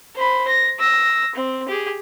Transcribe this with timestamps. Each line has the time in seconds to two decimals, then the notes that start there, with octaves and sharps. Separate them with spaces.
0.15 C5 B5
0.48 A#6
0.79 E6 A#6
1.35 C4
1.68 G4 G#4